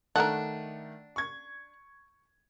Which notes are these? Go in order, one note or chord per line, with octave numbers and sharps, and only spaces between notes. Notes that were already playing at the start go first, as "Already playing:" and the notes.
D#3 A3 D4 A4 A#4 F#5
C#6 G#6